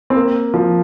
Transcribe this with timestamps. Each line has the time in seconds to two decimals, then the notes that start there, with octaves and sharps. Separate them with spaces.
0.10 C4
0.16 A#3
0.54 F3